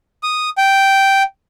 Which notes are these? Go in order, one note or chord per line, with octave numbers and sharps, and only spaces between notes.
D#6
G5